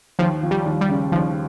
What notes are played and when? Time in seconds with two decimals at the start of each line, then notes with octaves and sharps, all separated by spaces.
0.19 D#2 F3
0.43 F3
0.51 G3
0.65 D#2
0.81 G3
0.89 C#3
1.12 D#2 F3